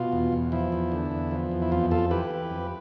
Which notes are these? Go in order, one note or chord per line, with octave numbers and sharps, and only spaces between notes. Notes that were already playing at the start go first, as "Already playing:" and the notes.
Already playing: B2 F4
E2
E2
F3 E4
E2
D3
E2
F3
E2
E4
F2 F4
F2 F4 A4
E3 G4 B4
E3
F2